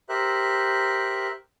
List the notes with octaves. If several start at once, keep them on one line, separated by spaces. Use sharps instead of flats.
G4 A#4 C5 E5 F#6